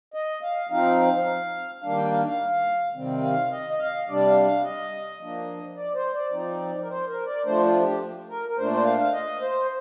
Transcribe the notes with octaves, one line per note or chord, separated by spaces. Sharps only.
D#5
F5
F3 C4 D#4 F5
D#3 G3 A#3 D4 F5
G5
F5
F5
C3 D#3 G3 C4
F5
D#5
D#5
F5
C3 G3 D4 D5
F5
F5
D#5
F3 A#3 D4
D5
C5
D5
F3 C4 D#4
A#4
C5
A#4
D5
F3 A3 D4 C5
F4
G4
A#4
A#4
A#2 A3 D4 C5
C5
F5
F5
D#5
C5